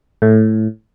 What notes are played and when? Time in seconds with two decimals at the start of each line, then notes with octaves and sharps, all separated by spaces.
0.22 A2